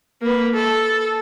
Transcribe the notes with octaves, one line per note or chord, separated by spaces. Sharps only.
A#3 B4
A4